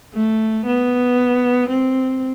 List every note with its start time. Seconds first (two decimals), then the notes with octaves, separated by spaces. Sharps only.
0.15 A3
0.66 B3
1.70 C4